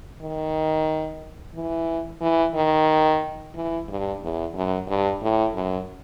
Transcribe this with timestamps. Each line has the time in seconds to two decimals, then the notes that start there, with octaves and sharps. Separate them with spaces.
0.21 D#3
1.55 E3
2.21 E3
2.55 D#3
3.55 E3
3.89 G2
4.22 E2
4.54 F#2
4.88 G2
5.22 A2
5.55 F#2